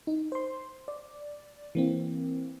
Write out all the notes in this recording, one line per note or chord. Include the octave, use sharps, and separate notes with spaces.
D#4
C5 C6
D5
E3 A#3 C4